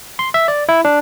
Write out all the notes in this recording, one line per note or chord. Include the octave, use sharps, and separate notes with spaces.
C6
E5
D5
E4
D4